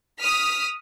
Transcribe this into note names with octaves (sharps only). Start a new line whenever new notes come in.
D#6 F6 B6